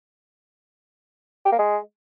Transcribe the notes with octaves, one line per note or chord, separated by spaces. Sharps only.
G4
A#3
G#3